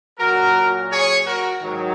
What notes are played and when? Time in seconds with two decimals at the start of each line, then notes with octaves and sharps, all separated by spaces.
0.19 A#2 F#3 F#4 A#4
0.90 G#4 C#5
1.25 F#4 A#4
1.61 G#2 D#3 F#3